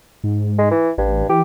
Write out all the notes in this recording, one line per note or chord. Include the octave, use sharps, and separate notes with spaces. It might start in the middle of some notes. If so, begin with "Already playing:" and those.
G#2
G#3
E3
A1 G2
E3 G4